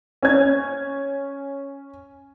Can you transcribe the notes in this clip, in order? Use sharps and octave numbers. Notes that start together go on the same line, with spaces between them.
C#4 G#6